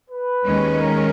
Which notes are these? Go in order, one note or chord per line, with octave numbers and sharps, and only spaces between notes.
B4
D#2 D#3 G#3 C#4
A#4